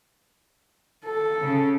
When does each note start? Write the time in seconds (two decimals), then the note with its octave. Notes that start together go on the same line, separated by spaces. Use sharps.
1.05 A4
1.42 C#3